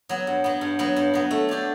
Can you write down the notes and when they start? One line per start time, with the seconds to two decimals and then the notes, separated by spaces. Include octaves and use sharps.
0.09 F#3 B3
0.27 G2
0.44 F#3 B3
0.61 G2
0.79 F#3 B3
0.96 G2
1.14 F#3 B3
1.31 A3
1.49 D4 G4 C#5